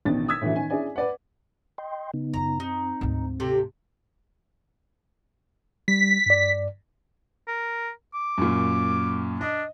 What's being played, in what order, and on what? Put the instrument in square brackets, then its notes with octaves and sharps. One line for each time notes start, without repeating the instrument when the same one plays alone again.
[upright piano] A1 B2 D#3 D4 A6
D#6 E6 G#6 B6
A2 D3 E3 F#3 A3
D#3 C#4 G#5
C#4 D4 E4 G#4 D5 G#5
B4 D5 F#5
[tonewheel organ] D#5 G5 C6
C#3 B3 D#4
[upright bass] F#2 F4 [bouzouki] A#5
[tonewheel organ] C4 [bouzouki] D#4
[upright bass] D2 G#2
[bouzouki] C3 G4 A4
[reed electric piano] G3 [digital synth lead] B6
[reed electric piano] G2 D5
[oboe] A#4
D6
[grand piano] F#2 A#2
[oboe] D4 [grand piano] D#5